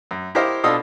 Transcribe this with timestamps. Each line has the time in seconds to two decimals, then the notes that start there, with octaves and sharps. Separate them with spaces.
0.11 F#2
0.35 E4 G4 A#4 C5 D#5 F5
0.64 B2 D4 F4 A4 D#5 D#6